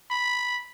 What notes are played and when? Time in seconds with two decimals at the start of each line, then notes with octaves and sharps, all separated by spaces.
0.11 B5